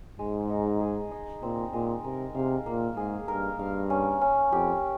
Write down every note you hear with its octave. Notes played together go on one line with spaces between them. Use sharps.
G#2 G#3
D#4
G#4
D#4
A#2 C4
A#2 G#3
C3 A#4
C3 F5
A#2 A#3
G#2 G#4
G2 A#4
G2 F5
C#4
C#4
F2 G4